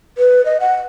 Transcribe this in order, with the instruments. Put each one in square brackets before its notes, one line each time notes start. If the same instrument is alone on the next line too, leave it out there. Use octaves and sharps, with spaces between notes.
[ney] B4
D#5
F#5